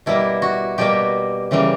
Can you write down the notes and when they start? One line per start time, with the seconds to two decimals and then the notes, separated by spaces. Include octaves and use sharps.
0.06 B2 G3 A#3 E4
0.42 F#4
0.78 B2 G3 A#3 G4
1.51 C#3 E3 G3 A#3